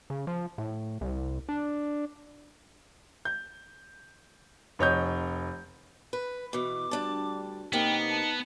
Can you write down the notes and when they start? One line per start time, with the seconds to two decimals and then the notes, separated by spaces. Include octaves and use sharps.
0.10 C#3
0.27 F3
0.58 A2
1.01 C2
1.49 D4
3.25 G6
4.79 F1 C#5 D#5 G6
6.13 B4
6.53 B2 E3 D6
6.91 D2 G3 D4 A5
7.73 C3 A#3 B3 D#4 G5
8.10 A5